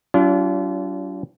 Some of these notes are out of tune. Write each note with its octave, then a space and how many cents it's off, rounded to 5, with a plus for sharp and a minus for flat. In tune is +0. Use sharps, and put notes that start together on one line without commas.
F#3 +45 D4 -40 F4 -30